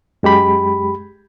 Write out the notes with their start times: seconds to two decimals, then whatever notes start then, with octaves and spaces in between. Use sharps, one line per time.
0.23 F#2 G#3 G4 B5